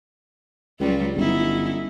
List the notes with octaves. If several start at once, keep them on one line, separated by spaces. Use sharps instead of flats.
C#2 F#3 G3 F4
G1 C#4 D#4 E4